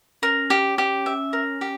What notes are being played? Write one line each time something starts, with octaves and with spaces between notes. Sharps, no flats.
C#4 A#4
G4
G4
E5
A#4
G4